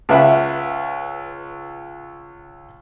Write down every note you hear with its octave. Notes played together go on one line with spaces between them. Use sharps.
C#2 B4 E5 F#5